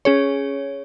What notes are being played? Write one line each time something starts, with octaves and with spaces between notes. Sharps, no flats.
C#4 G#4 C#5